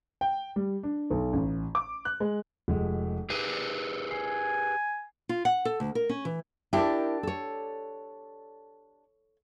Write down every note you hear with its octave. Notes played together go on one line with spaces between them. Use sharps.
G5
G3
D4
B1
A1
D6
F#6
G#3
F1 G#3
G4 G#4 B4 D#7
G#5 C7
F4
F#5
A4
D2
A#4
C#4
E3
D4 E4 G4 A#4 D5
A4 C#5